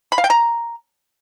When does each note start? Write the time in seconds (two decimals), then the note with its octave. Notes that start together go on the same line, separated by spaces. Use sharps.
0.12 B5
0.18 F5
0.24 G5
0.30 A#5